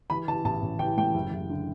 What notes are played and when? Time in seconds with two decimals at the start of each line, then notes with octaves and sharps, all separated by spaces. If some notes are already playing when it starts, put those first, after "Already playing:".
0.10 E3 B5
0.28 E3 A5
0.45 A1 A5
0.62 A1
0.79 E3 G5
0.97 A2 G5
1.14 F#1
1.32 F#1
1.50 D3